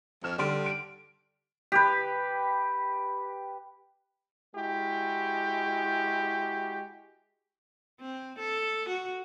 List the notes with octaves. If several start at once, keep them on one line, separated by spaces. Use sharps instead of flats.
F2 F6 E7
D3 G3 C6 D7
D7
G4 B4
G#3 E4 F#4 G4
C4
A4
F#4